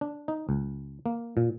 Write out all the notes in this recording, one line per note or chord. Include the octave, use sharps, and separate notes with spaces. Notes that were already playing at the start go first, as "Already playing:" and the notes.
D4
D#4
C#2
A#3
A#2